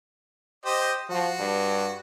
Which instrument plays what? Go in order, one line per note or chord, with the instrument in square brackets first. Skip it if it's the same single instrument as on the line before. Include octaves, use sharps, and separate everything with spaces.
[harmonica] G4 C5 D#5
[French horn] F3 [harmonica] F#4
[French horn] G2